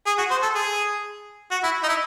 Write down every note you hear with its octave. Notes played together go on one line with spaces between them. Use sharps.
G#4
F#4
C5
A4
G#4
F#4
E4
D#4
E4